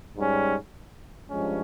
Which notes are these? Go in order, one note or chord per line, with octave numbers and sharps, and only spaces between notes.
G#2 G3 C#4
G2 F3 G#3 C#4